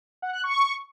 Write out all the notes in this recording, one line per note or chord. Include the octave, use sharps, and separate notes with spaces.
F#5
F#6
C#6